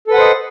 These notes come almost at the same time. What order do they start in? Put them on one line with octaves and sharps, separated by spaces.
A4 B4 F#5 C5 D#5